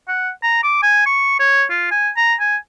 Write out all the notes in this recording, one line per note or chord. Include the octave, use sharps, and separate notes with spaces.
F#5
A#5
D6
G#5
C#6
C#5
F4
G#5
A#5
G#5